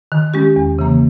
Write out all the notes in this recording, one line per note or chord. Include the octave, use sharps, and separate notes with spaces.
D#3
G#3 C#4 G4
E2
C#3 E3 A#3